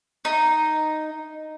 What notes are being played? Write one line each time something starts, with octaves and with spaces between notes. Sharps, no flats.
D#4